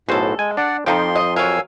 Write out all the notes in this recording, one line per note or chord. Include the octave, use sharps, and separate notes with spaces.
B1 A2 F#4 G#4 A4 C5
G#3 G#5
D4 D5 F#5
F2 F3 D#4 F4 G5 C6
D#5
F#3 A#4 F5 G#5 E6